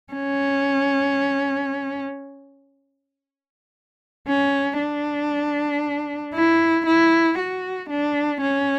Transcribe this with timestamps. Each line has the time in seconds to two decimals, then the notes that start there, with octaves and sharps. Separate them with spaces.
0.13 C#4
4.28 C#4
4.79 D4
6.34 E4
6.86 E4
7.39 F#4
7.90 D4
8.41 C#4